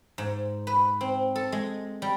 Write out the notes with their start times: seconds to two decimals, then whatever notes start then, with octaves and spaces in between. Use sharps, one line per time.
0.18 G#2
0.67 B4
1.01 C4
1.35 A4
1.52 G#3
2.02 G3